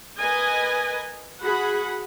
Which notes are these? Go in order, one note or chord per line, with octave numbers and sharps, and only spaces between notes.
A#4 B4 D#5 G#5
F#4 G#4 F#5 B5